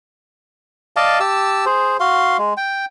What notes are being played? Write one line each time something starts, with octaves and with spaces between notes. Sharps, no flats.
D5 D#5 F5 A5
G4 A5 E6
G#4 C5
F#4 F5 C6
G#3
G5